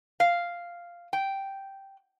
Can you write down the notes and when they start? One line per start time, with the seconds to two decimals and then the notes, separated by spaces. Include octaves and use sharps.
0.20 F5
1.13 G5